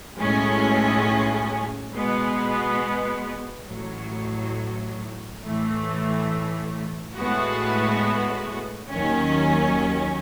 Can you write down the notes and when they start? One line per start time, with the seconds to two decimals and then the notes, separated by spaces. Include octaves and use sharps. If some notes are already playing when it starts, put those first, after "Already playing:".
0.18 B1 A2 G#3 C#4
1.92 B2 G#3 B3
3.66 A1 A2 F#3
5.42 A2 E3 A3
7.16 A2 G#3 B3 F#4
8.90 D#2 D#3 F#3 C#4